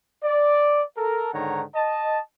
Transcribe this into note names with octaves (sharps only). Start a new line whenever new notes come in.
D5
A4 A#4
G#2 D3 D#3 C#5 F#5 A#5
D#5 A5